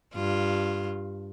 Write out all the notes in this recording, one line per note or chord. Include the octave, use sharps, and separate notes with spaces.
G2 F4